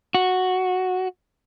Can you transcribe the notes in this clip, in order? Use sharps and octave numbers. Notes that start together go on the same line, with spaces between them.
F#4